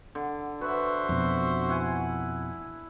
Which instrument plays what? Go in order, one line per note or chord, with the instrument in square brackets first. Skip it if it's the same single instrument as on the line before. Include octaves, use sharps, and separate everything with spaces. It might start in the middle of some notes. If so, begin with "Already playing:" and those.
[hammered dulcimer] D3
[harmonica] F#4 C5 E5 [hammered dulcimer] B4
[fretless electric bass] F2 B2
[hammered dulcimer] E4 F#5 G#5